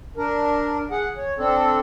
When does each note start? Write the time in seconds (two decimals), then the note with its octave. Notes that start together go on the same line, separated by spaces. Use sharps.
0.17 D4 A#4
0.91 G#4 F#5
1.17 C#5
1.38 C4 D4 A4